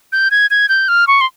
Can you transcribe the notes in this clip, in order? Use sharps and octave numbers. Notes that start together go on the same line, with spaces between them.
G6
G#6
G#6
G6
F6
C#6
C6